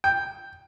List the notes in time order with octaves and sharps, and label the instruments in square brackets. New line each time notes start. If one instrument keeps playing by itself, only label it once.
[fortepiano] G5